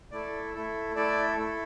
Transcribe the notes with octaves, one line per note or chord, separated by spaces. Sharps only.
A3 E4 A4 D5
A3 E4 A4
A3 E4 A4 D5
A3 E4 A4